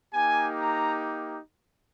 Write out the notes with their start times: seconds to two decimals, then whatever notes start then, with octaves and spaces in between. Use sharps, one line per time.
0.13 A#3 D#4 G4 G#5
0.57 A#5